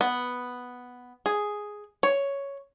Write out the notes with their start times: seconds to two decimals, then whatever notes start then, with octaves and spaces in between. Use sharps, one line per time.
0.01 B3
1.26 G#4
2.03 C#5